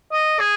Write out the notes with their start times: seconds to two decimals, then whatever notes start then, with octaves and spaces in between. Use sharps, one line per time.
0.12 D#5
0.40 G#4